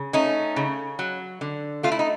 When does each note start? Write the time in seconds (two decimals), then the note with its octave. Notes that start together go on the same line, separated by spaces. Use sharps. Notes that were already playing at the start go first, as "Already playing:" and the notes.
Already playing: C#3
0.13 A3 C#4 D#4
0.56 C#3
0.99 F#3
1.41 D3
1.83 A3 F4
1.92 E4
1.99 D#4